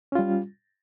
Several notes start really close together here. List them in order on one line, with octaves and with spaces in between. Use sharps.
C#4 F4 G3